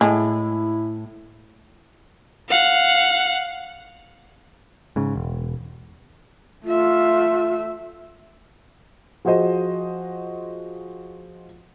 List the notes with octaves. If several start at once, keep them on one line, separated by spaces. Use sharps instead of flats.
A2 G#3 E4
F5 F#5
G#2 C#3
E1
A3 F4 E5
F3 F#4 G#4 C5 D#5